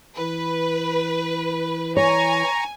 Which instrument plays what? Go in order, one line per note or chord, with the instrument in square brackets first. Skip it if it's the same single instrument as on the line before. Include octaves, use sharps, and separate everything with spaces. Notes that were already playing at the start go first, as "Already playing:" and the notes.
[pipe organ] E3 E4 [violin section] B4
[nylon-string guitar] C#5 [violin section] G#5 [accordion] A#5 C#6